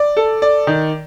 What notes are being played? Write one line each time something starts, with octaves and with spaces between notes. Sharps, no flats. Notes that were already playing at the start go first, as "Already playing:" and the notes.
Already playing: D5
A4
D5
D#3